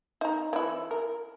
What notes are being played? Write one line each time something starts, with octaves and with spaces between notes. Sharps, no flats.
D#4 A#5
E3 E4
A#4